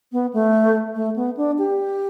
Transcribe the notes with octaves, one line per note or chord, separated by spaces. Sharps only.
B3
A3
A3
B3
D4
G4